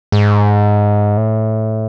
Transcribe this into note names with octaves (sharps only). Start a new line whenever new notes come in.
G#2
A2